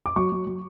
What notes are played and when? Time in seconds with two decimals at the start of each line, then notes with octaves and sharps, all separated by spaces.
0.06 D6
0.16 F#3 C#6
0.32 F#3
0.47 F#3